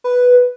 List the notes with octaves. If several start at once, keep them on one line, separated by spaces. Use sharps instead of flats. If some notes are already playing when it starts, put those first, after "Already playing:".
B4